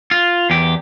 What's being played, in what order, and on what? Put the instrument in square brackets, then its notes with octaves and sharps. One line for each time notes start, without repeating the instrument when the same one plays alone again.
[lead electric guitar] F4
E2 G4